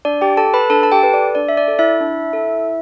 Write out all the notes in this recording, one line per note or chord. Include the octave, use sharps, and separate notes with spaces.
D4 D5
G4 G5
A4 A5
B4 B5
D4 A4 A5
A5
G4 G5
A4 B4
D5
D4 D5
E5
D5
A4
E4 E5
D4
A4